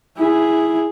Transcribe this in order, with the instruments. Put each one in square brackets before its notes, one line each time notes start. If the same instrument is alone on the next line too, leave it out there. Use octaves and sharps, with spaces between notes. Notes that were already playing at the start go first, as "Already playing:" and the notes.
[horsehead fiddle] E4 G#4